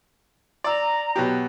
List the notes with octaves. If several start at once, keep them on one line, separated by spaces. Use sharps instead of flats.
D5 A#5 E6
B2 F#3 G4